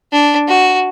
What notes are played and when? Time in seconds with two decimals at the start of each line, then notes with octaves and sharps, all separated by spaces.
0.13 D4
0.48 F#4